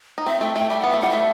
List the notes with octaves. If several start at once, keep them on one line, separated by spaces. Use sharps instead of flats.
D#4
C4 E5
A3 G5
A3 G5
G3 E5
B3 F#5
A3 E5
G3 F#5
A3 E5